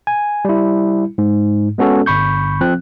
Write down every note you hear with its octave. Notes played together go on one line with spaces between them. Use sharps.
G#5
G3 E4
G#2
G#3 B3 C#4 F#4 A4
G1 B5 C#6 G6
F3 C4 F#6